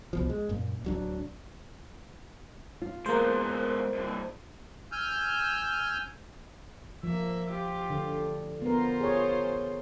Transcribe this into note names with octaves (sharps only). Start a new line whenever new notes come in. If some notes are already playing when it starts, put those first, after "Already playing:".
C2 B2 F3
G#3
F#2 A#2
D1 F#3 D4
F4
G#3 A#3 B3 C5
G2 C3
G#5 E6 F6 G6
F3 A#3 E5
F4 G4
D3
B3 F4 A#4 C5
G#4 C#5